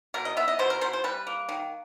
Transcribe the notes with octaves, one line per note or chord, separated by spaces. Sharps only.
B2 A#4
D#5
B3 E5
D#5
B2 C5
A#4
B2 C5
C5
G3 B4
A#3
D#3